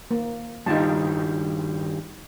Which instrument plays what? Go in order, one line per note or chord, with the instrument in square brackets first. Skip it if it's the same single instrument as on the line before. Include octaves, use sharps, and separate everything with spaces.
[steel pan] A#3
[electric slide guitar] G2 D#3 G3 [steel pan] D#4 F4 A5